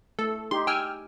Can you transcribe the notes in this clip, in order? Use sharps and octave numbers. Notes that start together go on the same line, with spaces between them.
A3 A4
D#4 G4 C6
G5 G#5 E6 F6